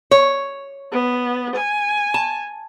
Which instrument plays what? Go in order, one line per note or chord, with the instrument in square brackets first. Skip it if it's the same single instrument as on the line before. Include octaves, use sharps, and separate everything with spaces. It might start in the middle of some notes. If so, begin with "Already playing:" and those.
[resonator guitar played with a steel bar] C#5
[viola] B3
G#5
[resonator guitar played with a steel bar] A5